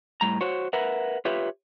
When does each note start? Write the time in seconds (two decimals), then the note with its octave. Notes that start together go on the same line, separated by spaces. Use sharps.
0.21 A2 G3 A#5
0.41 F#4 C5 C#5
0.73 A#4 B4 E5 F#5
1.25 F4 G4 B4 C#5 E5